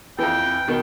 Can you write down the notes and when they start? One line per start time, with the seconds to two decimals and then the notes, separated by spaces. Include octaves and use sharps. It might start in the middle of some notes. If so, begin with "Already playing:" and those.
0.19 F2 E3 G5
0.67 B2 D#3